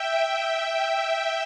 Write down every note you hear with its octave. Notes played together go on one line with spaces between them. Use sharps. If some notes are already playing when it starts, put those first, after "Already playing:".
Already playing: E5 G5
E5 G5